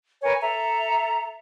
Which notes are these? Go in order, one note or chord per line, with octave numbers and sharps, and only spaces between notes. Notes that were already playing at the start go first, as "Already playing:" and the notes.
A#4 B4 C#5 G#5
A4 E5 A#5